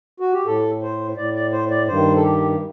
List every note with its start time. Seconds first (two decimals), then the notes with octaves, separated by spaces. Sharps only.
0.20 F#4
0.33 G4
0.46 A2 A4
0.83 C5
1.17 A2 D5
1.34 D5
1.52 C5
1.70 D5
1.88 G2 D#3 C5
2.16 A4
2.23 G4